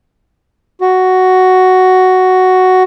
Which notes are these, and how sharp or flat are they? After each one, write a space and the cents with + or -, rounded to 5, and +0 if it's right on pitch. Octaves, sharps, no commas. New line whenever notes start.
F#4 +5